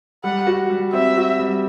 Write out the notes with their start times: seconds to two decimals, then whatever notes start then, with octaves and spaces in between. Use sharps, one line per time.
0.24 G3 F#5
0.47 F#4
0.70 G3
0.93 C4 E5
1.16 F#4
1.39 G3